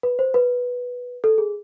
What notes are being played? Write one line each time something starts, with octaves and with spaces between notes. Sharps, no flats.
B4
C5
B4
A4
G#4